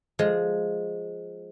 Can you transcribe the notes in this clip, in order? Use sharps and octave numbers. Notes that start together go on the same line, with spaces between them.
F3 G#3